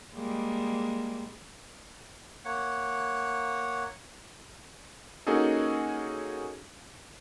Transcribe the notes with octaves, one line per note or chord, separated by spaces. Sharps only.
G3 G#3 A#3
A#3 C#5 F#5
A#3 C#4 D#4 F#4 G#4 A4